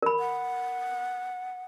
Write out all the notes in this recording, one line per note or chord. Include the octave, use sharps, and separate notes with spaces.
A#4 B5
F#5